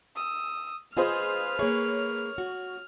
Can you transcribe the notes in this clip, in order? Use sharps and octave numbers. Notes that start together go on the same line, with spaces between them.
D#6 E6
F4 G#4 B4 C5 D#5 F6
A#3 G#4 C#5
F#4